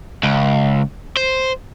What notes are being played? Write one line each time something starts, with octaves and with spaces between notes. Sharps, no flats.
C#2
C5